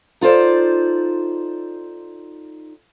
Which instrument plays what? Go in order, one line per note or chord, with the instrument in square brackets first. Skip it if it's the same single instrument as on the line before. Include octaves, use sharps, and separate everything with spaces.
[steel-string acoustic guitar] D#4 F4 A4 C5 D5